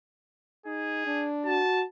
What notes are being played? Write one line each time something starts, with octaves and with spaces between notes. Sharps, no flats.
D#4 G#4
D4
F#4 A5